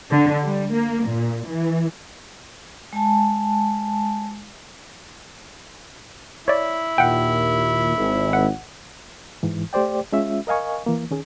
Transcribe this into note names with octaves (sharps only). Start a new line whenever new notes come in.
D3
G3
A#3
A#2
E3
G#3 G#5 A5
E4 C#5 D5
D#2 A#2 F#5 G5
G#1
F#5
G#2 E3
A3 G4 C5 D5 G5
G#3 C#4 F4 E5
A#4 D#5 F5 G#5 C#6
E3 A#3
D#3 C#4 G#4